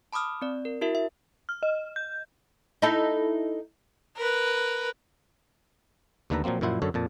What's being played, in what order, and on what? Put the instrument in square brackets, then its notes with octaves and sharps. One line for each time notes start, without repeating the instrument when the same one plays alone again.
[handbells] A5 B5 D6 D#6 F6
C4 D5
A#4
E4 F#4 A#4 E5
E5
[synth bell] F6
D#5
G6
[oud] D#4 E4 A4
[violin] A#4 B4
[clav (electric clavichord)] D#2 D3 A3 B4 E5 A#5
A#2 F3 F#3 A#3 C4
F#2 A#2 F3 E4 C5 F#5
F#2 D3 A4 C#5
F2 A#2 A5